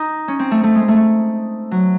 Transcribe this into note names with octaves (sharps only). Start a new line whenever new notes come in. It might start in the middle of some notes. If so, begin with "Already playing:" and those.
Already playing: D#4
C#4
C4
A3
A3
G#3
A3
F#3